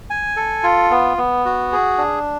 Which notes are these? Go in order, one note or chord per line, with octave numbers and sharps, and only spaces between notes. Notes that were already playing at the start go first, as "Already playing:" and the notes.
G#5
A4
F4
B3
B3
F#4
G#4
D4